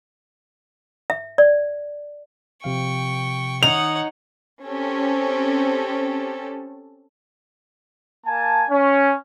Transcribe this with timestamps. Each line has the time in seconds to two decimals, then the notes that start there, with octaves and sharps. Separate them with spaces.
1.10 E5
1.38 D5
2.64 C3 F3 F5 G5 C#6
3.63 D#3 D#4 C#5 F#5 F7
4.65 C4 C#4 G4 A4
8.26 A#3 G#5 A5
8.70 C#4